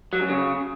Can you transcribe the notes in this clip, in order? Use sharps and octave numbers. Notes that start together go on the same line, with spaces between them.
F#3
F#2
C#3